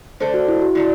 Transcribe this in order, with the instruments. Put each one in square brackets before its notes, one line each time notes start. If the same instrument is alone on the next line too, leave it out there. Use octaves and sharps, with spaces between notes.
[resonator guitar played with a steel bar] D3 A3 D4 A4 [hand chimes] C5
[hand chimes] F#4
E4
F#4
[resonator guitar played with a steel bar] D3 A3 D4 A4 [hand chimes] E4